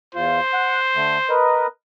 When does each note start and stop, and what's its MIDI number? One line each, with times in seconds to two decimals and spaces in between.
0.15 0.40 40
0.15 0.40 65
0.15 1.38 72
0.54 0.80 78
0.96 1.18 50
0.96 1.18 57
1.29 1.67 70
1.29 1.67 71
1.29 1.67 75